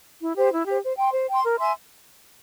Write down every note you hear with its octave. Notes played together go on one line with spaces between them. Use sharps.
E4
G4 C5
E4
G4 C5
C5
G5 C6
C5
G5 C6
A#4
E5 G#5 C6